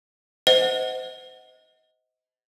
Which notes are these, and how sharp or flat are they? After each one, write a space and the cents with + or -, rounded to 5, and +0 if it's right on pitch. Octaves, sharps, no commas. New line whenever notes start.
C5 -25 D#5 +30 F#5 +0